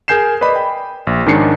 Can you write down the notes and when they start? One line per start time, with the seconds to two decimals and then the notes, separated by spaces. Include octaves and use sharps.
0.08 G#4 A#4 G#5 G6 C7 E7
0.41 B4 D5 D#5 B5
0.56 G5
1.07 A#1
1.26 G#2 D#3 C#4 D4 C7 C#7